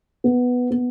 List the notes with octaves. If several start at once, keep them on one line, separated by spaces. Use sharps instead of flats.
B3
B3